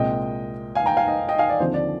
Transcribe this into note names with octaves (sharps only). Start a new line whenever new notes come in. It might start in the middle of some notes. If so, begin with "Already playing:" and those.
Already playing: C2 A#2 G#3 C4 D#5 G5
F5 G#5
G5 A#5
F5 G#5
D#5 G5
D#5 G5
F5 G#5
D5
D#2 D3 F3 C4 C5
D5